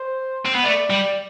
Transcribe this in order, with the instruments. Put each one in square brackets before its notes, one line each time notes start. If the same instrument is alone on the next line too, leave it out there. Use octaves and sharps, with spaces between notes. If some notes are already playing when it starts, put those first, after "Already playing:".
Already playing: [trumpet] C5
[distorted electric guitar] C4
B3
[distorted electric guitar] A3 [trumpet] D5
[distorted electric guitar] G3